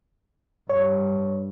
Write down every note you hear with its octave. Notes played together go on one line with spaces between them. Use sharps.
G2 C#5